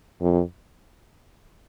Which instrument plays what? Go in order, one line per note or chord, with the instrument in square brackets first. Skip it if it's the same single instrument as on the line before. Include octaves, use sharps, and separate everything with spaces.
[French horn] F2